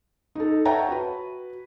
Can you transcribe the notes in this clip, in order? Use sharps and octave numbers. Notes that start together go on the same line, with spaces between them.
D#4 A4
C#5 E5 F#5 G5 A5 A#5
F#4 B4